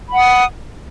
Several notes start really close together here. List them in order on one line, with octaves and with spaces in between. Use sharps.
B5 F#5 D#6